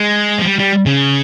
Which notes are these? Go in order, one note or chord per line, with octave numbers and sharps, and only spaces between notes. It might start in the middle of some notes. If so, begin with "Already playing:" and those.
Already playing: G#3
F3
G3
G3
C#3